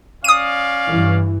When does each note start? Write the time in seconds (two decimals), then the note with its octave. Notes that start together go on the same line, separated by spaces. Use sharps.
0.24 C#4 D5 F5 D#6 D#7
0.87 G2 E3